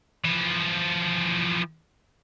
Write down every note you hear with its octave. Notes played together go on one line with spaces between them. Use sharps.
E3 F3